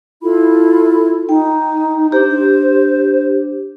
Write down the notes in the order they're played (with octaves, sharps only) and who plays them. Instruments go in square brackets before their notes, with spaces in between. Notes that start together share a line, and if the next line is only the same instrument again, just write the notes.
[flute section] E4 F4 A4 B5
[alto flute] D#4 [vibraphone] G5
[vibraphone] D4 G4 [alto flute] C5